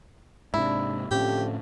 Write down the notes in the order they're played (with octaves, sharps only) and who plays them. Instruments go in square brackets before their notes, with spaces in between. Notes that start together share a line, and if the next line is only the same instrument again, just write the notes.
[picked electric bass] G#2 C3 [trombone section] D4 [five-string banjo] E4
[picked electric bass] A2 C4 C#4 [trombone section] D3 F3 A3 [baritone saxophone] G4